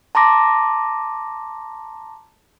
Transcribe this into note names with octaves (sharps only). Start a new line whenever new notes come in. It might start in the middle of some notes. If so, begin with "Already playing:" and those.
A5 A#5 C6 D6 A#6